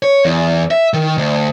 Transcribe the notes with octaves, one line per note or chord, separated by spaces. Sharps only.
C#5
E2
E5
D#3
D2